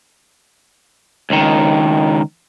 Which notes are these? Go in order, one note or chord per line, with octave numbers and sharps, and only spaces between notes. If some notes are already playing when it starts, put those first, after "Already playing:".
C#2 D#3